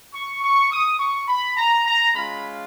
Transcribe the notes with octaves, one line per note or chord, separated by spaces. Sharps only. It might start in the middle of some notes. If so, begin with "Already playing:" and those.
C#6
C#6
D#6
C#6
B5
A#5
A#5
G#3 C#4 F4 B5